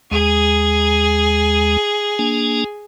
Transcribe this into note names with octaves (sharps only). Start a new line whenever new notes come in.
D#2 G#3 G#4
A#3 D4 G#5